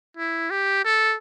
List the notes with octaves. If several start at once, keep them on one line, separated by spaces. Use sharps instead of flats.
E4
G4
A4